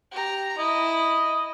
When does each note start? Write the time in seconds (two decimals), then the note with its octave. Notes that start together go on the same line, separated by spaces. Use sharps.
0.12 G4 A#5
0.58 E4 D#5